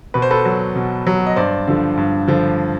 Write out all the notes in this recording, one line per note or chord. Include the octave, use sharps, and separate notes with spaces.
B2 B4
C5
A4 B4
F#3
B2
F#3
D#5
G2 C5 D5
D3 F3
G2
D3 F3